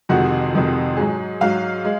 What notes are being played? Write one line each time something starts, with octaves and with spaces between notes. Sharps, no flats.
F2 C3 D#3 G#3 F#4
F2 C3 D#3 G#3
G#2 F#3 G#4
G#2 F#3 F5
G#3